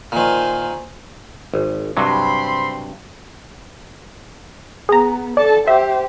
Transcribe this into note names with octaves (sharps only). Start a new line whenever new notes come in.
A#2 D#3 C5 G#5
G#1
G2 C3 F#3 C4 B5 C6
B3 G#4 A#5
A4 D5 A5
G4 C5 E5